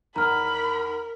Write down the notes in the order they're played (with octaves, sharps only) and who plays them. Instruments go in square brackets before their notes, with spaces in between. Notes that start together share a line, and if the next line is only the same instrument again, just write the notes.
[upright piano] E2 D#3 [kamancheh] A#4 [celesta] A#5 F6 [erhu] B5